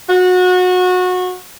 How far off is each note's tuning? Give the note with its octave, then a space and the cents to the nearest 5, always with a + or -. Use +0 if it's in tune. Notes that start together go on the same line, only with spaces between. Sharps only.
F#4 -25